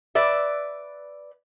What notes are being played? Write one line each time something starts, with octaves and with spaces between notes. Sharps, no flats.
B4 D5 E5